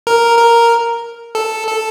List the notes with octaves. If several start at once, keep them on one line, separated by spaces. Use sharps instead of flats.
A#4
A#4
A4
A4